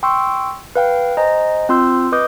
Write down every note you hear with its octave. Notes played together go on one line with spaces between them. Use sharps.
G5 C6 C#6 E6
B4 F5 G5
C5 D#5 G#5 A#5
C4 F4 C6 E6 G6
B4 D#5 D6 D#6 G6